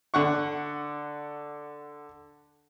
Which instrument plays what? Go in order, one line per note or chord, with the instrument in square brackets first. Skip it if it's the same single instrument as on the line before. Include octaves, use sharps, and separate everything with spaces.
[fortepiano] D3 F#5 C#6